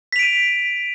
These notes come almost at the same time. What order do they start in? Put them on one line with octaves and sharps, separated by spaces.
B6 F7 D7 D#7